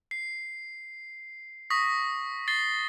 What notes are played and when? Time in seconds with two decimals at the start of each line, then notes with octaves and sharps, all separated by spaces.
0.11 C7
1.70 C#6 D#6 A#6 B6
2.48 A6 C7 G7